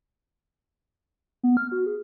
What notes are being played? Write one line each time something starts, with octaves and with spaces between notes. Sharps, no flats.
B3
F6
F#4
G#4